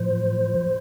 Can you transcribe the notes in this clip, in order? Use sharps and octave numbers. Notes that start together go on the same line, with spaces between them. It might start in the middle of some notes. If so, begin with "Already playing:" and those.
Already playing: A2 F3 C5